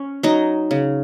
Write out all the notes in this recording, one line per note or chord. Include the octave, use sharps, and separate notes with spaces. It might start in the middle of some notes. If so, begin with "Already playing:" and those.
Already playing: C#4
F#3 D#4 D#5
C#3